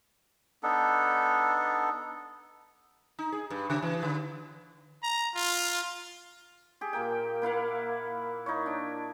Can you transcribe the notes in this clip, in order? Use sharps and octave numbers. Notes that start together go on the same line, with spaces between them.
B3 D4 D#4 A4
D#4
G#4
G2
C#3
E3
D3
A#5
F4
G4 G#4
A#2 A#3 A#4 G5
A#3 E4 F5 F#5
D#4 E4 C#5
D4